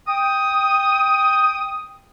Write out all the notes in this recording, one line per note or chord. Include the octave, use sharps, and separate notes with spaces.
G5 D#6